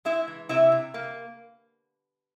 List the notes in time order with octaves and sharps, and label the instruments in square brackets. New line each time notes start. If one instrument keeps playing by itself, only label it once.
[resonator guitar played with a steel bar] G#3 E4 E5
E3
C3 E4 E5
C3
A#3